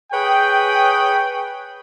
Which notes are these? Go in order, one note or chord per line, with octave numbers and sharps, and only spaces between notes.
G#4 B4 C#5 G5